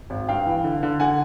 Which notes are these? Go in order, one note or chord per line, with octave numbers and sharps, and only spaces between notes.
G#1
G2 F5 G5
E3
D3
D3
D3 F#5 G#5